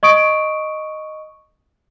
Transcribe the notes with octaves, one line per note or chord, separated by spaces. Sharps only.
D#5 C#6 D#6 D7